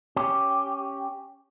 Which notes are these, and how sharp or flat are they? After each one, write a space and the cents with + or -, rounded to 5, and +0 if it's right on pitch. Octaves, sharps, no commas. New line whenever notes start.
C#4 +0 G4 +0